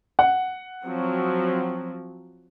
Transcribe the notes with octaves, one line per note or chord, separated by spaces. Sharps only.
F#5
F3 F#3 C4